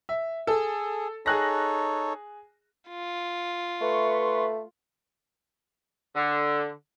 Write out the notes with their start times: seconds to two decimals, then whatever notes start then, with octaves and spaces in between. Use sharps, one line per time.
0.09 E5
0.47 G#4 A4
1.26 D#4 G#4 A4 C#5 F#6 A#6
2.89 F4
3.81 A3 B4 E5 C6 C#6
6.15 D3